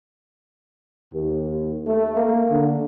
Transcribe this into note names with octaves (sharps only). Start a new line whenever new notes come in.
D#2
A3
A#3
D3